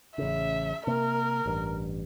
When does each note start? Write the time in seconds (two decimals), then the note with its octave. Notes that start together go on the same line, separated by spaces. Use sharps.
0.18 A1 C#3 E5
0.87 C3 A#3 A#4
1.46 A1 G2